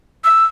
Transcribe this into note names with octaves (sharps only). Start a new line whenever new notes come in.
E6